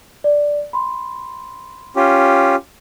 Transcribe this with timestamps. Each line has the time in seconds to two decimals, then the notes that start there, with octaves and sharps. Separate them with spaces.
0.24 D5
0.73 B5 C6
1.96 C#4 F4 G4